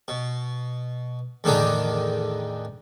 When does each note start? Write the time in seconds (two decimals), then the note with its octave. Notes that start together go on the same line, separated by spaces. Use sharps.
0.08 B2
1.44 E2 A2 D3 D#3 D4 D#4